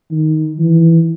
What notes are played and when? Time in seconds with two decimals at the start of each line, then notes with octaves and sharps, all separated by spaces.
0.11 D#3
0.58 E3